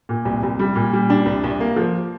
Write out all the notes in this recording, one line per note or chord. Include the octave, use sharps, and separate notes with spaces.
A#2
C2
C2
G3
A#2
G3
D4
C2
C2
A#3
F3